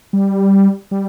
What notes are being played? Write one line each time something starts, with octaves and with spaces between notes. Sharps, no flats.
G3
G3